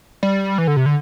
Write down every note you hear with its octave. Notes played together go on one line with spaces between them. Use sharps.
G3
E3
D3
C3
D3